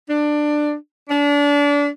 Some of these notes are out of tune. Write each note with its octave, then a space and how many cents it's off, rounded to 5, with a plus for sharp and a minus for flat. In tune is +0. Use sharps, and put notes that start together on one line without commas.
D4 +15
D4 -30